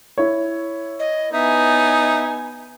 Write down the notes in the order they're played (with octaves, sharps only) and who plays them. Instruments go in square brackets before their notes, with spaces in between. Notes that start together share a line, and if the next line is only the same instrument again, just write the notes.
[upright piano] E4 C#5
[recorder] D#5
[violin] B3 G#5 [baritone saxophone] D#4 [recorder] E5